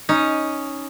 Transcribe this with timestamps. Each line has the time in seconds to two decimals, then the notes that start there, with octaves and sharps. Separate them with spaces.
0.09 C#4 D#4